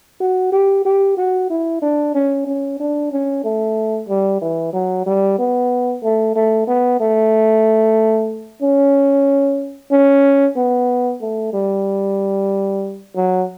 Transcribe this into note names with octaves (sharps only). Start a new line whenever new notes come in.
F#4
G4
G4
F#4
E4
D4
C#4
C#4
D4
C#4
A3
G3
E3
F#3
G3
B3
A3
A3
B3
A3
C#4
C#4
B3
A3
G3
F#3